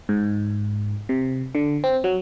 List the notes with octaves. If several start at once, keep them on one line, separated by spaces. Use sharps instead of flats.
G#2
C3
D3
C4
F#3